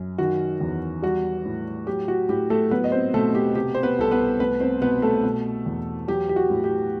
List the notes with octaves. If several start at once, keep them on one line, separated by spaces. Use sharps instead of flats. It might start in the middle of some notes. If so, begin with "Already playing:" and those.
Already playing: F#2
D#3 F#4
E2
G3 F#4
A2
F#3 G4
F#4
A2 G4
A3 A4
F#3 B3 B4
D#5
C4 C5
B2 A3 A4
G4
C3 G4
C5
B3 B4
C2 A4
B3 B4
A3 B3 B4
C4 C5
B2 B3 B4
A3 A4
B2
E2
F#3 G4
G4
F#4
A2
G4